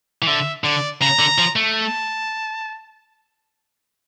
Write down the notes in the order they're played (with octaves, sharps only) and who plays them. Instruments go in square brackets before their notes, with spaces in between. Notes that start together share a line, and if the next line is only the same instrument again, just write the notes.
[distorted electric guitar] E3
[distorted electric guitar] D3 [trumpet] E5
[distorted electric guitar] D3 [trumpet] D5
[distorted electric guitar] C#3 [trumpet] A#5
[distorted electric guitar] D3
F3
A3
[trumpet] A5